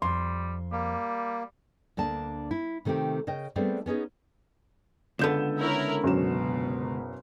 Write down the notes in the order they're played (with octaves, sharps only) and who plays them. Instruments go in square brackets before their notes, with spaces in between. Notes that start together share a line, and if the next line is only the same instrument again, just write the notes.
[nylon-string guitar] F2 [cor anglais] G3 [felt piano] C6
[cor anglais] G3 [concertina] A#3
[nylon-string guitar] D2 A#3 D4 A5
E4
C3 D#3 A3 C4 G4
C#3 A#4 D#5 G5
G3 A3 B3 C4 D4 G#4
B3 C#4 D#4 G#4
[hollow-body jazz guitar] C#2 D3 B3 [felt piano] A4 G6 E7
[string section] E4 A#4 C#5
[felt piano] F#1 F#3 E7 [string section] B2